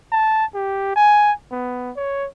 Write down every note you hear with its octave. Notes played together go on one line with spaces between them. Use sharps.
A5
G4
G#5
B3
C#5